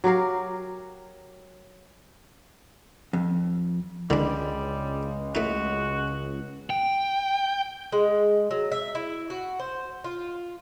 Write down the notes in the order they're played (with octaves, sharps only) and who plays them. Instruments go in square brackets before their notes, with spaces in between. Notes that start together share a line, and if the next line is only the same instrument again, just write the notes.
[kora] F#3 G4 A#4 F5
[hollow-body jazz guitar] F2
[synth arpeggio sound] C#2 [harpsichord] D3 D4 [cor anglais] G3 [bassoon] G#3
[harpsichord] A3 D#4 [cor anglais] F#4
[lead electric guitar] G5
[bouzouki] G#3
F#3
E5
E4
F#4
C5
F4